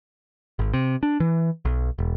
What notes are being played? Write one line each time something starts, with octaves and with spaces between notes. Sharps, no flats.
G#1
C3
D4
E3
B1
E1